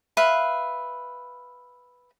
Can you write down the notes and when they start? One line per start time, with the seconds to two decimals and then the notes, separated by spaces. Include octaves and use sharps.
0.17 B4 E5 F5